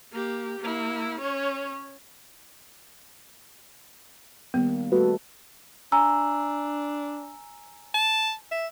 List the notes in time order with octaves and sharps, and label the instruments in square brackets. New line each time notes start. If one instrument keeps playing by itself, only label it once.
[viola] A#3 G4
A#3 E4
C#4 C#5
[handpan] D#3 G3 A#3 [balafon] B3
[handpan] G3 A3 A4 [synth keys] F#4 B4
[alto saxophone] D4 [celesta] G#5 A#5 E6
[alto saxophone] A5
E5